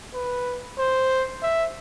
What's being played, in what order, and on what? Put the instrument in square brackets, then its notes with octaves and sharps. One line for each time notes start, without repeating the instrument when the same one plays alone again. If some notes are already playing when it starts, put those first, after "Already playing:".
[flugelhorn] B4
C5
E5